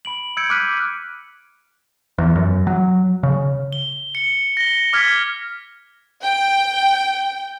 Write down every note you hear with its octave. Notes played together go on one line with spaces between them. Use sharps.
B5 D7 F#7
E6 G6 G#6 C#7 D7
D6 F6 F#6 B6 D#7
E2
F#2
F#3
C#3
G7
C#7
A#6 G7
D6 F6 G#6 B6
G5